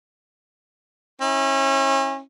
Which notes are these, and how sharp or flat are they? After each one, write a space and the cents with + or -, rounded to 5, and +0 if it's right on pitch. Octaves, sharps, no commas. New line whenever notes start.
C#4 -35 E4 -35